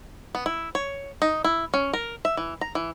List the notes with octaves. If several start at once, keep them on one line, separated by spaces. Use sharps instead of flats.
B3
E4
C#5
D#4
E4
C#4
A#4
E5
E3
A#5
E3